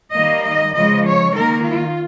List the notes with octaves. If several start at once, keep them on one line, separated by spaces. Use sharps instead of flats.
D#3 G3 A#3 D#5
D#5
C#3 F3 G#3 D#5
C#5
D#3 A#3 A#4
F4